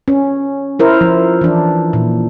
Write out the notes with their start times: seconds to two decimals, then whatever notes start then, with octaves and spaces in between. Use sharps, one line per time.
0.08 C#4
0.79 E4 A#4 C5
1.01 F3
1.41 E3 D4
1.93 A#2